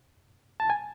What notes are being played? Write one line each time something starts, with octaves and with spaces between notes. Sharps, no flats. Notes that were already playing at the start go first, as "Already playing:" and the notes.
A5
G#5